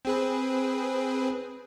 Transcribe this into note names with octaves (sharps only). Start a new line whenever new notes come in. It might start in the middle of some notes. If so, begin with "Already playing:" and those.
C4 G#4 B4